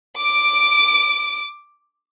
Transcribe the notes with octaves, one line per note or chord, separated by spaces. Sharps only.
D6 D7